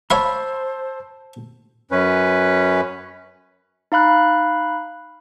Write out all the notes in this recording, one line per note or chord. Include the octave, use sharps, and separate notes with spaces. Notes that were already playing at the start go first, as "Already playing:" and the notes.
C5 C#5 F5 A5 B5 C6 E6
F#2 C#4 B4
D#4 F5 B5 F#6